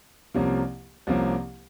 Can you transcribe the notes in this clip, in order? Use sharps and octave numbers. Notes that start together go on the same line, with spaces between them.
C2 C3 F3 A#3 C#4
C2 C3 F3 A#3 C#4